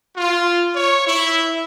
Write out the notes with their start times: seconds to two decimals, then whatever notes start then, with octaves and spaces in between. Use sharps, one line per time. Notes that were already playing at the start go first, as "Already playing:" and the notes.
0.17 F4
0.75 C#5
1.06 E4